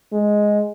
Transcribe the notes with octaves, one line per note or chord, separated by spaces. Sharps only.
G#3